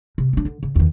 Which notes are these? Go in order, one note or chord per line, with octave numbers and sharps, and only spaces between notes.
C3
F#3 D4
D3
C#3
E2 D#3